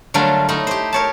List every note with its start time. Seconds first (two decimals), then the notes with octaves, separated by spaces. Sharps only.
0.14 D3 F#3 G3 A3 F4 A#4
0.49 A3 D#4 E4
0.67 G4 C5
0.93 A#4 C#5 A5